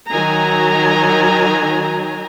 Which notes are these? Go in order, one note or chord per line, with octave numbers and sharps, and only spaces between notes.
D#3 F#3 G#5 A#5